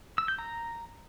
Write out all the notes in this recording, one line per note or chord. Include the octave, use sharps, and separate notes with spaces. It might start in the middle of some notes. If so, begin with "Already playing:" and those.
E6
G6
A#5